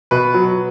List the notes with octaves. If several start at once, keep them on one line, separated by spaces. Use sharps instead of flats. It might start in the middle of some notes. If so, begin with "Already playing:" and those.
B2 B4
F#3